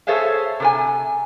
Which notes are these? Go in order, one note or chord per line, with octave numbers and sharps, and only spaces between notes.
G#4 A4 C5 C#5 E5 F5
C3 A#4 G#5